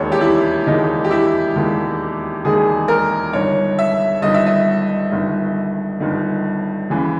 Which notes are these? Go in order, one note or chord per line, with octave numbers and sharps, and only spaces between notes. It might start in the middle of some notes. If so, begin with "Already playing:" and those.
Already playing: E1 D#2 D#3 G#3 C#5
G4
E4
E1 D#2 D#3 G#3 D#4
G4
E4
E1 D#2 D#3 G#3
E1 D#2 D#3 G#3 G#4
A#4
G1 G2 D#3 C#5
E5
G1 G2 D#3 D#5
E5
D#5
G1 G2 D#3
G1 G2 D#3
D#2 C#3 E3